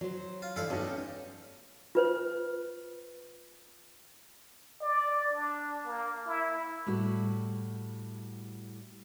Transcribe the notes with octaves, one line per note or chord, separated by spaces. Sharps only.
F#3 C5
F4
G2 E3 E4 A4 F5
B1 A2 C#4 G4 A4
F4 B4 C5
D5
D4
A#3
E4
A2 G3 F#4